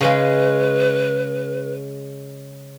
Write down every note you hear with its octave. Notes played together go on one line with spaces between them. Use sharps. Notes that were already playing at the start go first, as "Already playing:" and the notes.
C#3 G#3 B4